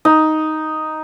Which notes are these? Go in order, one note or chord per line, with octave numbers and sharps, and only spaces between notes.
D#4